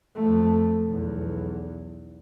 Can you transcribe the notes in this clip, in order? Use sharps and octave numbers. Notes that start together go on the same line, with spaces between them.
F2 A3
B1 E2